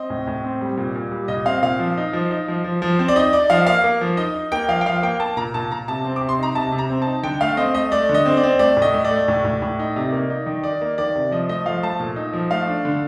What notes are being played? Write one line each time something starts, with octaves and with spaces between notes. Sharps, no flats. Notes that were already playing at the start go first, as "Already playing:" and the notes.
Already playing: C4 D#5
A2
A2
C4
G3
A#2
A#2
G3
A#2 D#5
C4 F5
A#2 F5
F3
D#4
F3
D#4
F3
F3
F3
C4
D5
D#4 D#5
D#4 D5
F3 F5
A#3 F5
A#3
F3
D#4 D#5
D#4
A#3 G5
F3 F5
G5
F3 F5
A#3 G5
A#3 A5
A#2 A#5
A#2 A5
A#2 A#5
C3 A5
C4
D6
C3
C6
D#4 A#5
C3 A5
C3
A#5
C4
D#4 A5
D3 G5
A3 F5
C4 D#5
A3 D#5
A3 D5
D3
D#5
C4
D5
C4
A3 D5
A2
D#5
A3
D5
A3
A2
A2
A2
D#4
C3
A#3
D#4
D#3
D#4 D5
A#3
D#3 D5
C3
F3 D#5
A3 D#5
F3 F5
A3 A5
A#2
D#4
F3
A3 F5
D4
D3